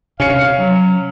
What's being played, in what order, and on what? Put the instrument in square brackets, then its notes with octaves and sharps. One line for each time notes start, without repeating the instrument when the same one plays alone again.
[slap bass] C3 [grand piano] C#4 C#7 [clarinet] F5
[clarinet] F#3